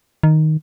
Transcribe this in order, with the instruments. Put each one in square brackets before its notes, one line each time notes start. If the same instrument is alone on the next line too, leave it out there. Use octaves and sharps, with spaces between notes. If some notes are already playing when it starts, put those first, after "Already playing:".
[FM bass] D#3